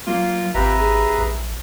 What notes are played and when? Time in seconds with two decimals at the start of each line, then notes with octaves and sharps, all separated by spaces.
0.07 F#3 A#3 F4
0.55 G#1 C3 F4 G4 B4 E5 A#5
0.79 D#2 G#4
1.18 A#1